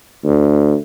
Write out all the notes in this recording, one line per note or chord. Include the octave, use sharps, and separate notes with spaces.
D2